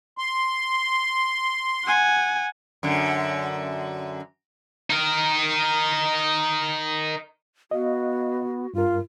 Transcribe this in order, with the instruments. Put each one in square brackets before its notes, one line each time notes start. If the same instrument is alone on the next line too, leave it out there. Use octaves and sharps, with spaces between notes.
[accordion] C6
[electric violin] F#5 G#5
[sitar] F#2 D3
[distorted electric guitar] D#4 A#4
[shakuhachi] B3 [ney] F#4 [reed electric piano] D#5 F5
[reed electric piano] G2 A#4 [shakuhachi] F4